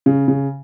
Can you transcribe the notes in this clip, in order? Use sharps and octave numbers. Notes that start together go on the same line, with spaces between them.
C#3
C#3